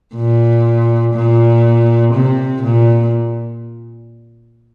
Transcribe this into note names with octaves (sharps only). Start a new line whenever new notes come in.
A#2
A#2
C3
A#2